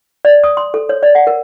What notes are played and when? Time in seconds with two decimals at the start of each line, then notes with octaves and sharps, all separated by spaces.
0.25 D5
0.44 D#6
0.57 C6
0.74 A4
0.89 C#5
1.03 D5
1.15 F#5
1.27 A#4